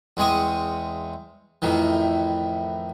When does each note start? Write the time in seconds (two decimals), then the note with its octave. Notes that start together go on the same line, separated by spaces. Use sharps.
0.17 E2 G#3 C4 C#5 C#6 D#6
1.62 F2 A2 D#3 E3